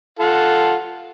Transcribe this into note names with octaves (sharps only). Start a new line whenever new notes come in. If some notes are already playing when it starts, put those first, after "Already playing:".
F4 A4 F#5